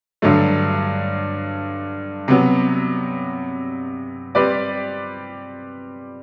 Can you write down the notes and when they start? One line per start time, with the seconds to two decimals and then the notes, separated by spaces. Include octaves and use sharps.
0.22 G2 D3 F#3 A3
2.28 C3 F#3 B3
4.35 G3 C4 G4 B4 D5